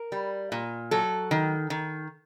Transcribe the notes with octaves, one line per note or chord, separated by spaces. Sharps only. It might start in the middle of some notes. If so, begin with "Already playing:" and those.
Already playing: A#4
G3
A#2
F#3 A4
D#3
D#3